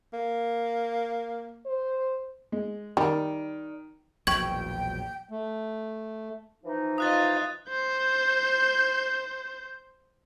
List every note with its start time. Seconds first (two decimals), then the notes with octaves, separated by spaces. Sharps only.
0.14 A#3
1.66 C5
2.52 G#3
2.97 D#3 G3
4.27 E1 A#1 F#3 G5 C#6 G#6
5.29 A3
6.64 E3 F3 D#4
6.98 F4 D#5 D#6 F#6 A6
7.69 C5 G6